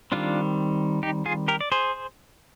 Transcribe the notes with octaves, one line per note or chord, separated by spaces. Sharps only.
D#3 G3 C4 D4 F4
D#4 G4
F4 G#4
G4 A#4
D5
G#4 C5